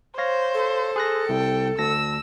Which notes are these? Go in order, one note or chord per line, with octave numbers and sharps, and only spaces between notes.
C5 C#5 F5 A#6
A4
G#4 F#6 A#6
C2 C3 G5
D2 A5 E6 A#6